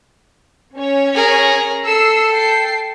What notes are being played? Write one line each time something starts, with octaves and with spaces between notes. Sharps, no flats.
C#4 C#5
G#4 A#4
A4 E6 C7
G5 A5 C7